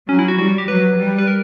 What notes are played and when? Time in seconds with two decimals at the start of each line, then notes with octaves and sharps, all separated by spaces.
0.09 F#3 C#4
0.19 E4
0.28 F#4
0.38 G3 F#4
0.49 F#4
0.58 G4
0.68 F#3 B4
0.98 G3
1.18 B4
1.27 A#4